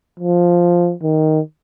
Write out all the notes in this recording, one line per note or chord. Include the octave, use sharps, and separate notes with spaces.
F3
D#3